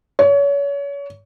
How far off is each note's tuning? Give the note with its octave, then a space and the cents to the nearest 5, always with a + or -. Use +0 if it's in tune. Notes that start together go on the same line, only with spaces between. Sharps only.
C#5 +30